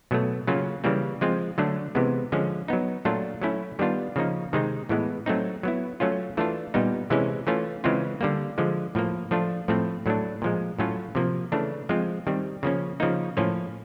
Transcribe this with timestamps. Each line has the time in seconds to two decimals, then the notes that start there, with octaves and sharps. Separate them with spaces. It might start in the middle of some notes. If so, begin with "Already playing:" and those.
0.11 B2 F#3 A3
0.47 C#3 F#3 A#3 C#4 F4
0.84 C#3 E3 G3 A#3
1.21 F3 G#3 C4 F4
1.58 D3 F#3 A3 D4
1.95 C3 E3 G#3 B3
2.32 D3 F3 G#3 C#4
2.68 F#3 B3 D#4
3.05 A#2 F#3 A3 D4 F4
3.41 F#3 A3 C#4 E4
3.79 D#3 G3 B3 D4 F4
4.16 C#3 F3 A#3 D#4
4.53 C3 D#3 G#3 C4 D#4
4.89 A2 E3 G#3 B3
5.26 F#3 A3 C4 D#4
5.63 F#3 B3 E4
6.00 F#3 A3 C#4 F4
6.37 E3 A3 D4 F4
6.74 A#2 G3 B3 D#4
7.10 C3 E3 G#3 C#4 E4
7.47 E3 A3 C#4 F4
7.84 C#3 E3 G#3 C4 F4
8.21 D3 G3 A#3
8.58 D3 F3 G#3
8.95 A2 F3 A#3
9.31 F3 A3 D4 F4
9.68 A2 F3 A3 C4
10.06 A2 F#3 A3 D4
10.42 A#2 F3 G#3
10.79 A2 F#3 A3 C#4 F4
11.15 C3 F3 A#3
11.52 C#3 E3 A3 D4
11.89 F3 G#3 C4 F4
12.27 D#3 G3 C4
12.63 C#3 F3 A#3 C#4
13.00 C#3 F3 A#3 D#4
13.37 A2 F3 A#3 C#4 F4